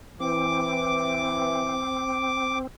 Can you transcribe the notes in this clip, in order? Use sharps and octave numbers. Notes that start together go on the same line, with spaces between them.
E3 C4 D6